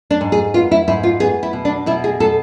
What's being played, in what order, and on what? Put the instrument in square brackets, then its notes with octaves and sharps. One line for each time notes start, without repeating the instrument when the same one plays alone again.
[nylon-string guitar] D4
G#2
G#4
B3 F4
E4
G#2 E4
F4
B3 G#4
E4
B2
D4
B2 E4
G#4
B2 A4